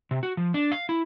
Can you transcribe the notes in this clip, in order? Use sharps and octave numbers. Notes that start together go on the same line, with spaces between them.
C3
F#4
F3
D4
F5
E4